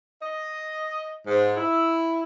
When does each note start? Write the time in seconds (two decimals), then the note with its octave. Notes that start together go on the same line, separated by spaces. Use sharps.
0.22 D#5
1.27 G#2
1.57 E4